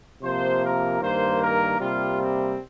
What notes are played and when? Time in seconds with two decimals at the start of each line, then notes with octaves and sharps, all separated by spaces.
0.22 C3 F3 A#3 C5
0.62 A#4
1.01 G2 D#3 A#3 C5
1.40 A#4
1.79 C3 G3 A#3 F4
2.19 C4